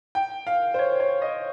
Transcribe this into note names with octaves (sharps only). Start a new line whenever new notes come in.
G5
F5
C5
C#5
C#5
D#5